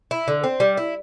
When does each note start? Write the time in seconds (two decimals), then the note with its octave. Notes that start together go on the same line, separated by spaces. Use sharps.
0.11 E4
0.28 D3
0.44 C4
0.60 G3
0.77 E4